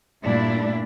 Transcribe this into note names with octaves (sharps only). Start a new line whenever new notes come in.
G2 A#2 A3 D4 E4